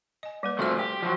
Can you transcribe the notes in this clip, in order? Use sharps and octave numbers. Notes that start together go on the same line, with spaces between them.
D#5 G#5
G3 A#3 B4
C3 F3 A3 F#4 A4 E5
G4
F3 F#3